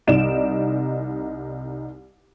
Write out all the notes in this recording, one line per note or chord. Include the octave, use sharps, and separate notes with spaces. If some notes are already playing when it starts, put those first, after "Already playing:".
C2 D#4 D5 D7 E7